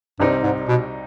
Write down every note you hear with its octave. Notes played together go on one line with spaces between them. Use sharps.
C2 G2 C3 G3 C4 D#4
G#2
B2